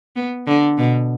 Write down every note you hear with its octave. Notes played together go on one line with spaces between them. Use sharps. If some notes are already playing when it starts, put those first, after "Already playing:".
B3
D3
B2